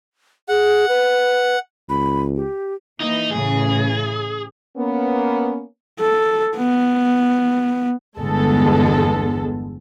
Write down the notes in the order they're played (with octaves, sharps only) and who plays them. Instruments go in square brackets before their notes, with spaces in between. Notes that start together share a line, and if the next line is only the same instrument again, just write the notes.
[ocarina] G#4 [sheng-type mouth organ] F#5
[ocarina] B4
[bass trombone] C#2 [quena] B5
[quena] G4
[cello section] E3 A#3 [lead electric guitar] D#4
[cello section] A2 C#3 E3 [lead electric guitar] G#4
[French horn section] A#3 B3 C#4
[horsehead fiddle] A4
B3
[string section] G1 E2 G#3 B3 A4